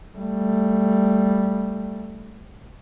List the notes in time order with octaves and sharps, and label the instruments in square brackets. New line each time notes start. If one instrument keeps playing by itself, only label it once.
[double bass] G3 A3